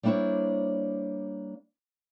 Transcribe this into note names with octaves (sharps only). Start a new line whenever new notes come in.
G3 A#3 D4 E4 C5 C#5